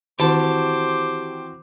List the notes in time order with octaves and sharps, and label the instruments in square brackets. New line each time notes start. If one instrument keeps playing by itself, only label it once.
[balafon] D#3 [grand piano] E3 C4 F#4 [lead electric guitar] G4 A5 [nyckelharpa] C5 D6